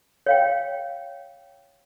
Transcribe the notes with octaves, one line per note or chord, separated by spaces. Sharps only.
C#5 F5 G5